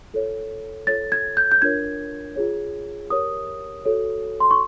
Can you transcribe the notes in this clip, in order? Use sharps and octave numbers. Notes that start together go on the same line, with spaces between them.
F4 A4 C#5
F4 A4 C#5 A6
G#6
G6
G6
D4 F4 A#4 C#5 G#6
F4 G#4 C#5
G4 A#4 C#5 D#6
F#4 A4 C#5
C6
C#6